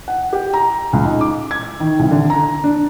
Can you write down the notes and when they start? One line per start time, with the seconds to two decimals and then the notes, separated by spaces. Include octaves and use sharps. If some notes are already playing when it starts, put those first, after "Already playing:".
0.08 F#5
0.33 G4
0.54 A#5
0.93 C#2
1.05 D#4
1.21 D6
1.51 G#6
1.80 D#3
1.99 C2
2.11 D3
2.30 A#5
2.64 D4